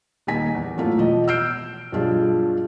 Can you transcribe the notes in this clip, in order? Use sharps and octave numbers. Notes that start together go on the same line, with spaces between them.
D#1 G3 A#3 D#4 G#5 B6
E2
F#2 A2 A3 A#3 E4 F4
E1 E2 F3 D#5
E6 F6 G6 C7 D7
B1 G2 F3 D4 F4 G#4